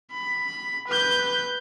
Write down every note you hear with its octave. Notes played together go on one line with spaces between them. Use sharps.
B5
B4 G6